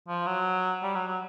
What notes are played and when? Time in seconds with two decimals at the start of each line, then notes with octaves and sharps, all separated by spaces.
0.08 F3
0.27 F#3
0.83 G3
0.95 F#3
1.07 F#3